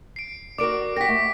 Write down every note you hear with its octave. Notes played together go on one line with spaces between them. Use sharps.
C7 D7
F#4 A#4 D5 D6 D7
G4 F#5 A#6 B6
A3